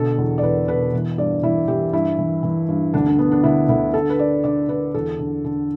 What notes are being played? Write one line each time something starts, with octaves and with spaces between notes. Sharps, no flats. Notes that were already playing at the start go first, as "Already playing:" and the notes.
Already playing: B2 D3 A4
E2
D5
E2 B4
B2 B4
E3
G2 D5
E3 E4
E3 G4
G2 E4
E3
E3
G2
D2 D4
D4
D3 B3
D4
D2 E4
D2 E4
D3 A4
B4
D3 D5
D3 D5
D3 B4
E2 A4
D3
D3